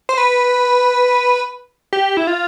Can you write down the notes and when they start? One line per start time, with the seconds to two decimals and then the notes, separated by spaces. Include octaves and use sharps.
0.09 C5
0.18 B4
1.93 G4
2.17 E4
2.27 F4